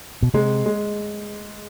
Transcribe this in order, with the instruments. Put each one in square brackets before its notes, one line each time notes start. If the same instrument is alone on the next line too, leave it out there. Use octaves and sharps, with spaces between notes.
[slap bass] B2
[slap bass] C3 [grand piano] G#3
[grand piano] G#3